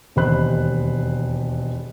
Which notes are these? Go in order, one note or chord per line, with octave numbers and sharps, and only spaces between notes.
E1 D#2 D#3 C5 B5 F#6